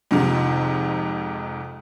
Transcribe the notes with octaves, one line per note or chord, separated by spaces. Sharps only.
F2 G#2 C3 D#3